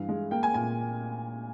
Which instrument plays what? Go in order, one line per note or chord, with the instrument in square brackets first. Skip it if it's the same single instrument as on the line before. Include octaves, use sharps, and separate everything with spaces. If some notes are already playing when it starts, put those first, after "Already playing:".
Already playing: [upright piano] G2 E3 F5
G#3
A#3 G5
G#5
A#2 G#5